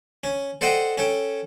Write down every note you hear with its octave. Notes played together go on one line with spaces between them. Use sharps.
C#4
A4 C5 D5 D#5 F#5 G5
C#4 A4 G5